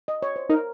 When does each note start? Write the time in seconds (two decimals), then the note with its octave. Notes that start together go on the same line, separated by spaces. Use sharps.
0.08 D#5
0.22 C#5
0.36 C5
0.49 D#4 A#4